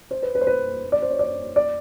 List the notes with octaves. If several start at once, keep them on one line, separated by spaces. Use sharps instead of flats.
C5
B4
B4
C5
B4
D5
C5
C#5
D5
D5